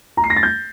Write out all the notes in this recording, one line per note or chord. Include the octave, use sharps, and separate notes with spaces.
A#5
C7
A#6
A6
G6